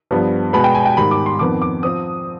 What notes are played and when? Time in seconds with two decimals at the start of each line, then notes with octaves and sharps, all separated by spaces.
0.11 G2 F3 B3
0.53 B2 G#3 B3 B5
0.64 G5
0.75 G#5
0.85 G5
0.97 G#2 D#3 G3 B5
1.11 D6
1.26 C6
1.39 F2 D#3 B3 D6
1.62 D6
1.83 F3 C4 D#6